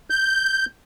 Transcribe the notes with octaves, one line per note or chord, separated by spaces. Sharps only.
G6